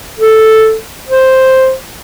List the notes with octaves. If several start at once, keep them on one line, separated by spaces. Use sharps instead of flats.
A4
C5